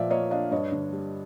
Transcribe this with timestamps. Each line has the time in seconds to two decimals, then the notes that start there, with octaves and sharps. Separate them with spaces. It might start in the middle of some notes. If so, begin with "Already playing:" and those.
Already playing: A#2 F3 D5 E5
0.10 A#3 C#5 D#5
0.31 D4 D#5 F5
0.51 G2 C#5 D#5
0.72 D3
0.92 G3